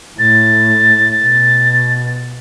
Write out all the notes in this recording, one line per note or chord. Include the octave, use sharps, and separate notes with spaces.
A2 A6
B2